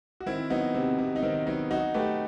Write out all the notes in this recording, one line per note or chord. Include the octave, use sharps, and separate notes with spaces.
F#4
D#3 C4 E4
F#3 B3 D#4
C3 C4
C3 B3
D#4
D#3 C4
F#3 B3 D#4
F#3 D#4 F#4
A3 G4 B4